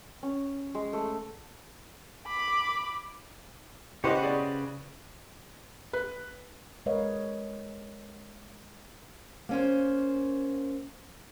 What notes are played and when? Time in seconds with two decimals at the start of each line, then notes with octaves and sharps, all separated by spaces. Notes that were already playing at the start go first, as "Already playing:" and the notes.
0.23 C#4
0.75 G#3
0.93 A3
2.27 B5 D6
4.04 C#3 E4 F#4 G4 B4 C5 D#5
4.23 G#4 D5
5.93 B4
6.86 G#3 A#4 B4 C#5 D#5 F5
9.49 A#3 C#4 C5